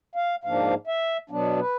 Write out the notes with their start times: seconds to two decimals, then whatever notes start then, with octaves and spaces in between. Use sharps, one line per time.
0.15 F5
0.44 G#2 F3 A#3 D4 F5
0.87 E5
1.30 B2 F#3 B3 D4
1.59 B4